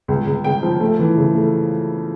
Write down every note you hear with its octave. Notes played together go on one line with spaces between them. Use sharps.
C#2
C#2
C#3 G5
F3
A3
E3
C#3
A3